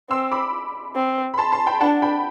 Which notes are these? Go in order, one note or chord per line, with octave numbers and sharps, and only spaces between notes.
C4 C6 E6
B5 D6
C4
B5
A5 C6
A5 C6
G5 B5
D4 F#5 A5
G5 B5